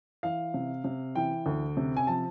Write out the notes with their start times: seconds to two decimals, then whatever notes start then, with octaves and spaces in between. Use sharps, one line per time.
0.23 E3 F5
0.54 C3
0.84 C3
1.16 E3 G5
1.46 D2
1.77 C3
1.97 G#5
2.07 F3 A5